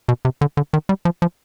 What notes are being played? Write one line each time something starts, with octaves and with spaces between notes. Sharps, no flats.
B2
C3
D3
D3
D#3
G3
F3
F3